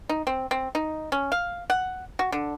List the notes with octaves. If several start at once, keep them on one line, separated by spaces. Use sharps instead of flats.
D#4
C4
C4
D#4
C#4
F5
F#5
F#4
D3